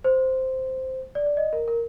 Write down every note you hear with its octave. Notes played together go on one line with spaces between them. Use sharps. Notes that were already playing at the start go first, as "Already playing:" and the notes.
C5
D5
D5
D#5
A#4
A#4